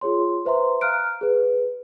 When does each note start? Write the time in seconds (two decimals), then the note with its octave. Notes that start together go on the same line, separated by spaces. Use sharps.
0.01 F4 G#4 C#5 C6
0.45 B4 C5 E5 A#5 C6
0.81 F5 A#5 F6 F#6 D7
1.21 G#4 B4